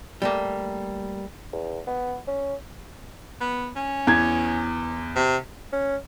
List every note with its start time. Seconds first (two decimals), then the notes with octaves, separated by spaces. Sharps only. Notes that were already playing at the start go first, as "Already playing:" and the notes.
0.22 G3 A3 A#3
1.53 E2
1.87 B3
2.27 C#4
3.41 B3
3.76 C#4
4.07 E2 G#6
5.16 C3
5.72 C#4